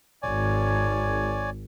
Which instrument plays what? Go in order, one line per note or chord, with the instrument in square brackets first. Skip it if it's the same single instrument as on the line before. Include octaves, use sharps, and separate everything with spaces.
[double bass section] G#1 [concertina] C#5 D5 G#5